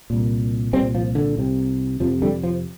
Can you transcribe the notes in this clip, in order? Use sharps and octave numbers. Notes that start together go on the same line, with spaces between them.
C2 A#2
C2 A#2 G3 C4
F3
D3
C2 C3
F2 C3 F3
D3 G3
F3